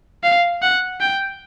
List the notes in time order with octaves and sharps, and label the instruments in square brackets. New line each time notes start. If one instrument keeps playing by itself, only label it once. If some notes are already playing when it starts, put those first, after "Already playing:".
[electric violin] F5
F#5
G5